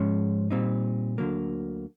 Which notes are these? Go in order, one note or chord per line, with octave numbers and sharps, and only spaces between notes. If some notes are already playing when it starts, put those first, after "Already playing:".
Already playing: G#2 F3 G#3 C#4
A#2 G3 C4 D#4
D2 D3 F#3 A#3